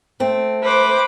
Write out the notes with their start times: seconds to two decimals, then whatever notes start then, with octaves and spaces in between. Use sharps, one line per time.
0.20 A3 C4
0.62 B4 C5 D6